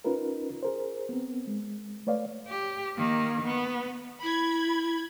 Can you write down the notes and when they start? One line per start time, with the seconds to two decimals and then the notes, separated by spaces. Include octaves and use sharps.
0.04 C#4 D#4 F4 A#4 B4
0.63 G#4 A#4 C5
1.09 B3 C4
1.47 G#3
2.07 A3 B4 C#5 D5 F5
2.48 G4
2.97 D#3 A#3
3.46 B3
4.23 E4 B5 G#6